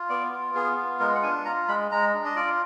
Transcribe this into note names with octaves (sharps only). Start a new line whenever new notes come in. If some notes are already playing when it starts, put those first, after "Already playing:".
Already playing: F4
B3 D5
F4
B3 G#4
F4
G#3 A#4
F#5
D4 G#5
F4 A#5
G#3 B5
G#3 A#5
D4
D#5
F4 D5